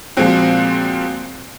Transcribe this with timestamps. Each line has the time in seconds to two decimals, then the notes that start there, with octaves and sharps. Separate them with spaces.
0.17 A#2 F3 G#3 C4 F#4